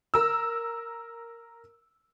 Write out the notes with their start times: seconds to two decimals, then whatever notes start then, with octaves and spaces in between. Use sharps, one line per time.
0.14 A#4 E6